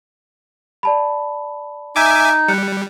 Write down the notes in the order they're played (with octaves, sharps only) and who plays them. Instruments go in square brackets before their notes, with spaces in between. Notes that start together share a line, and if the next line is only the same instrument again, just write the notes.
[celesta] D5 A5 B5
[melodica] D#4 [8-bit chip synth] E5 G#5 D6
[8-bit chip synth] G3 [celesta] F#6 C#7